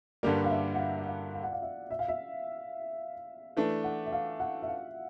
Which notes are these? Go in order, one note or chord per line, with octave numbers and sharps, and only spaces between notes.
G2 D3 G3 A#3 D5
F5
E5
F#5
F5
E5
F5
F5
F#5
F5
E5
E5
F5
E5
E3 A3 D4
F#5
E5
F5
F#5
E5
F5